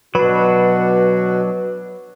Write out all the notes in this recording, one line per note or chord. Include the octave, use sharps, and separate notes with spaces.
B2 F#3 D4 F#4 B4